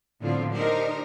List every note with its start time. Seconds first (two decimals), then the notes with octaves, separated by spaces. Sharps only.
0.21 A2 D3 F3 B3 C4 F4
0.54 D4 D#4 G4 A#4 C5